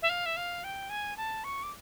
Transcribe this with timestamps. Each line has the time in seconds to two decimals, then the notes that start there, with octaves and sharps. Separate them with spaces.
0.02 E5
0.09 F5
0.25 E5
0.36 F5
0.64 G5
0.89 G#5
1.16 A5
1.44 C#6
1.63 D6